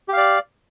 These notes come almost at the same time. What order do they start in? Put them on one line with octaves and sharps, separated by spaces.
G4 F5 D5